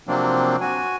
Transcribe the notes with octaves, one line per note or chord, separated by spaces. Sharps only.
C3 F3 F#3 A#3 C4 D4
F#4 G#5